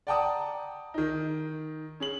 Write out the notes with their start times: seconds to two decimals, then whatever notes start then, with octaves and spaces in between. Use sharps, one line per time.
0.07 D5 F#5 G5 A5 A#5 D#6
0.94 D#3 D#4
2.00 C#4 G#4 F#7